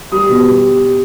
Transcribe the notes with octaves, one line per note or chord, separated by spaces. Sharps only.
G3 D#6
B2
G3